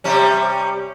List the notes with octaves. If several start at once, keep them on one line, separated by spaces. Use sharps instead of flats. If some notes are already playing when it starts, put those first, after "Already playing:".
C3 G3 C#4